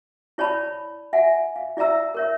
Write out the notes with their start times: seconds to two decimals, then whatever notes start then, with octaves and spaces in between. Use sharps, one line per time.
0.38 E4 C#5 D5 A5 B5
1.13 E5 F#5 G#5
1.56 F5
1.77 E4 D5 E5 A#5 E6
2.15 A#4 C#5 E5